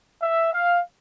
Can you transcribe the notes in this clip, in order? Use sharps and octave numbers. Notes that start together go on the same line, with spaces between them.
E5
F5